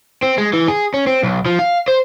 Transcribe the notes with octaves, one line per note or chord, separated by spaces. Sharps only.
C4
G#3
E3
G#4
C#4
C4
B1
F3
F5
C5